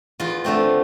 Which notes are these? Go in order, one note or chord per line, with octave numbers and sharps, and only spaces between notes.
E2 F4
D3 A3 C4